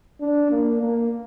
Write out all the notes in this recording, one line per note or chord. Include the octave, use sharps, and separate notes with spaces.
D4
A#3
A#3